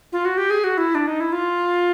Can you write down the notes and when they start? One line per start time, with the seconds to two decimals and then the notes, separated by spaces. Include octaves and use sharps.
0.12 F4
0.25 F#4
0.37 G4
0.50 G#4
0.64 F#4
0.78 E4
0.95 D4
1.07 D#4
1.20 E4
1.32 F4